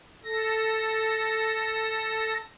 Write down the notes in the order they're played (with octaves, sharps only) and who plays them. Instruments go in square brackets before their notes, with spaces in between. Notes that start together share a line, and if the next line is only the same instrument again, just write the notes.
[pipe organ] A4 A#6